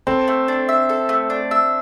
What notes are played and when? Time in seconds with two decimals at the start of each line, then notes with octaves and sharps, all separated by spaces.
0.07 C4 A4
0.28 A3
0.48 D4
0.69 E5
0.89 A4
1.09 A3
1.30 D4
1.51 E5